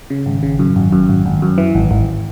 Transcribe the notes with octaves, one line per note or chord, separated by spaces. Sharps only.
C#3
G#1
C#3
F#2
G#1
F#2
G#1
G#1
F#2
E3
G#1
G#1